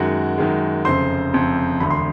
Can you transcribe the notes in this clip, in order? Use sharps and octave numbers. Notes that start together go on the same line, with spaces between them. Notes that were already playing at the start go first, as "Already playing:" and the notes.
Already playing: F#2 D#3 G#3 F#4 F#5
F#2 D#3 G#3
F1 F2 C#3 C5 C6
F1 F2 C#3
E1 D2 D3 B5
C6